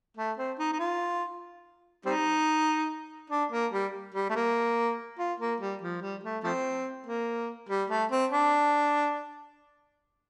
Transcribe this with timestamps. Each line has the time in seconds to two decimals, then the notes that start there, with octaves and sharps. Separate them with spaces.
0.17 A3
0.37 C4
0.59 D#4
0.72 D#4
0.79 F4
2.05 G3 C4 D#4
3.30 D4
3.52 A#3
3.72 G3
4.15 G3
4.30 A3
4.35 A#3
5.18 F4
5.40 A#3
5.60 G3
5.82 F3
6.02 G3
6.24 A3
6.44 F3 A3 C4
7.06 A#3
7.69 G3
7.90 A3
8.11 C4
8.32 D4